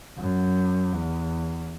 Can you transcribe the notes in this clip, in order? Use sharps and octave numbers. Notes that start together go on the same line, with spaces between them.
F#2
E2